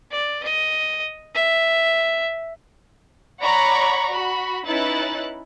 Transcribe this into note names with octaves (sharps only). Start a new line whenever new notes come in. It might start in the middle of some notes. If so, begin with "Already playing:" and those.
D5
D#5
E5
C#5 D5 F#5 A#5 B5 C#6
F#4 B5
C#4 D#4 E4 B4 F#6 A6